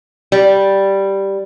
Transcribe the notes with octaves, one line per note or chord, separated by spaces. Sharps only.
G3